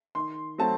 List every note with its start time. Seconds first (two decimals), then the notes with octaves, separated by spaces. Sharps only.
0.15 D#3 C6
0.58 F#3 A3 C4 A5